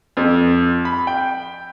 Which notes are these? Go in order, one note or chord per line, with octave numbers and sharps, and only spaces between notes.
F2
B5
G5